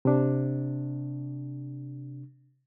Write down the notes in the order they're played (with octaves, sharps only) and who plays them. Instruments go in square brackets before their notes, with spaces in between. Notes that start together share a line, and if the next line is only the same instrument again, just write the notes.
[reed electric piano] C3 D4